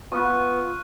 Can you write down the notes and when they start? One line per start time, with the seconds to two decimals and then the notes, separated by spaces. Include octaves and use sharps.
0.12 B3 F4 C#6 F6 F#6